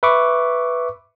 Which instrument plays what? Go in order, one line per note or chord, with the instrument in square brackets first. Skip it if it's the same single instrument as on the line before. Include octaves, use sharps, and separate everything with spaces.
[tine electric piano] B4 E5 B5 C#6 D6